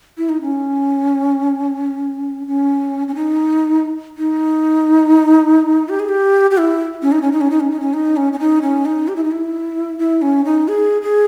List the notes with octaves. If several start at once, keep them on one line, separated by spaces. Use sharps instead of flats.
E4
D#4
C#4
C#4
C#4
D#4
D#4
G4
G#4
G4
G4
E4
C#4
D#4
C#4
D#4
C#4
D#4
C#4
D#4
C#4
D#4
C#4
C#4
D#4
C#4
D#4
G4
E4
D#4
E4
E4
C#4
D#4
G#4
G#4